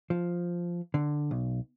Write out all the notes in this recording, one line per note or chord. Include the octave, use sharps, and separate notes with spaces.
F3
D3
B1